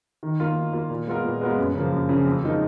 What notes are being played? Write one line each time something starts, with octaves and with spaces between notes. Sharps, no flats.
D#3
A#3 F4
D#3
A#3 F4
A#2
G#3 B3 F4 A#4
A#2
G#3 B3 F4 A#4
F#2
C#3 F3 A#3
F#2
C#3 F3 A#3
F2
F3 G#3 D#4 A#4